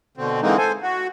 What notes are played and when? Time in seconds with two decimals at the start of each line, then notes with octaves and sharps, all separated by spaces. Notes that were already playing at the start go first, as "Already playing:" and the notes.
0.17 B2 D3 C4
0.42 D3 E3 G#3 A#3 C4 D#4
0.58 A4 C5 G#5
0.82 F#4